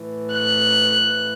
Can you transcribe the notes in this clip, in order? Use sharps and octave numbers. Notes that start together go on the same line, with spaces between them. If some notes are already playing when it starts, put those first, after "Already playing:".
Already playing: A2 E3
F#6